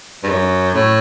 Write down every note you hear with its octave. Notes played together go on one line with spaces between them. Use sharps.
G2
F#2
A2